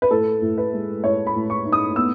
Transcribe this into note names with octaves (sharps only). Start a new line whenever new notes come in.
B4
A2 A4
A2
B4
G#3
A2 C#5
B5
A2
C#6
D#4
D#6
B3 E6